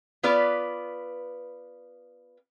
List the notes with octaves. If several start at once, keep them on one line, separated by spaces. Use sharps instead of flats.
B3 F4 B4 D5